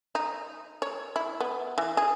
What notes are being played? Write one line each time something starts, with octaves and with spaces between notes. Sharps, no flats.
D#4
C#5
E4
B3
E3
G#4